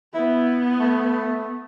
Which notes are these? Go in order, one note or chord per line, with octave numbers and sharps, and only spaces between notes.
B3 E4
A3